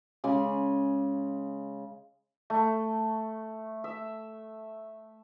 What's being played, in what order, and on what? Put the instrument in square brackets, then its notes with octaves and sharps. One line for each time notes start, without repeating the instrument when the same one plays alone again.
[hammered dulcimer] C#3 G#3 G#5 D6
[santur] A3
E5